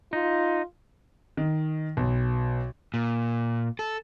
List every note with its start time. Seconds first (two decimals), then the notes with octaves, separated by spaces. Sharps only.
0.13 D#4 F4
1.37 D#3
1.97 B1
2.94 A#2
3.79 A4